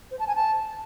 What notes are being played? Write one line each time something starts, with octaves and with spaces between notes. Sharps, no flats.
C5
A5
G#5
A5